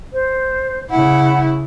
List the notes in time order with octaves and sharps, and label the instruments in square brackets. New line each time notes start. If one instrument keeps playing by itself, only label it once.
[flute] C5
[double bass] C#3 E4 [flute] F#5